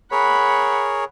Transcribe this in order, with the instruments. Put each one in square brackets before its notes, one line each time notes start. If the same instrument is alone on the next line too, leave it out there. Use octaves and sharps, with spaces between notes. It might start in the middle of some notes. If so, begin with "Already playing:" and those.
[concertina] G#4 A#4 C#5 [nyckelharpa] F#5 B5